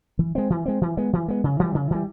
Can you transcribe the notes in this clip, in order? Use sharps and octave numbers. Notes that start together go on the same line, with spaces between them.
E3
G#3 C4
E3
G#3 C4
E3
G#3 B3
E3
G#3 B3
C#3
E3 G3
C#3
E3 G3